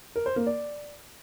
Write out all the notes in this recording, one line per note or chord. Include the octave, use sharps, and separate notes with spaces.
A#4
C5
A#3
D5